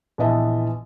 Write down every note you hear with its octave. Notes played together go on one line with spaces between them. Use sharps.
A#1 E3 B3 D#5 E5 A5